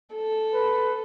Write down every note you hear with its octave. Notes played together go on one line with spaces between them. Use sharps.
A4
B4